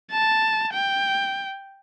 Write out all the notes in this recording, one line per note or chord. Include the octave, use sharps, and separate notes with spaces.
A5
G5